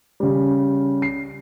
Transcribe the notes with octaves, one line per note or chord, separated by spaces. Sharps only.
C#3 G3
C7